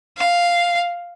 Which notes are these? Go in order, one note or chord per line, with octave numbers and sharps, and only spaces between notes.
F5